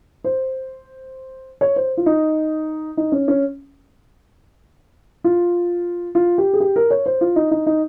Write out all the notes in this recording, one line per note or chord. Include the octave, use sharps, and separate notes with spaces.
C5
C#5
C5
F4
D#4
D#4
C#4
C#4
F4
F4
G4
G#4
G4
A#4
C#5
C5
F4
D#4
D#4
D#4